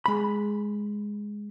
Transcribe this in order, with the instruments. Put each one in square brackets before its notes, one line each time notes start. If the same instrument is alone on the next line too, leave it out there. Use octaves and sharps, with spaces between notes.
[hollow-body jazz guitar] G#3 B5